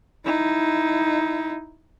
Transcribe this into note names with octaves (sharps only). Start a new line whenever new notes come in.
D#4 E4